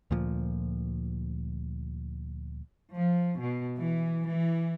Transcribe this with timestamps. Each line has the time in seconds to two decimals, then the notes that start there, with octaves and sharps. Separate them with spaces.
0.11 D2 A#2 F3
2.95 F3
3.39 B2
3.77 E3
4.27 E3